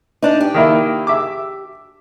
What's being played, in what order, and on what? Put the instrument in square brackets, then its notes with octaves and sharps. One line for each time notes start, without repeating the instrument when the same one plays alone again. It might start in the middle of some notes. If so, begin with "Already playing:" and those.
[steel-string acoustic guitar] D4 D#4
G4
[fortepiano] D#3 A#3 E4
E5 D6